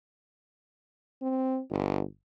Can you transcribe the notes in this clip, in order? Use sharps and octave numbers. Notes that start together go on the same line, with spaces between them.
C4
G1